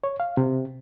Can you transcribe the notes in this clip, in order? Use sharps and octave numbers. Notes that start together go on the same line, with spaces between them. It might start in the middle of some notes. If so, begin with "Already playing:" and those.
C#5
F5
C3